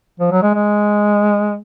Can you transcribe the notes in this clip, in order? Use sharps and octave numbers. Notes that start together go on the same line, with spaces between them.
F3
F#3
G#3
G#3